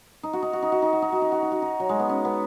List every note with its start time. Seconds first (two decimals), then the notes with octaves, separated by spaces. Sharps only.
0.23 D#4
0.33 F#4
0.42 D#4
0.53 F#4
0.62 D#4
0.72 F#4
0.82 D#4
0.93 F#4
1.02 D#4
1.12 F#4
1.22 D#4
1.32 F#4
1.42 D#4
1.52 F#4
1.62 D#4
1.80 F#3
1.89 G#3
2.00 B3
2.09 C#4
2.25 B3